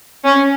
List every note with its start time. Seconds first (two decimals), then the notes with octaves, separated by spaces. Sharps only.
0.25 C#4